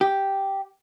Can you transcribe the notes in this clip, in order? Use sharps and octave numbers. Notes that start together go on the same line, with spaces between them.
G4